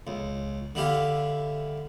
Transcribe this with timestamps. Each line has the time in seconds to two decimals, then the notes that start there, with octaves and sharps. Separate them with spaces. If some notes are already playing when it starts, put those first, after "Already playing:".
0.07 C#2
0.75 D3 E4 G4 F5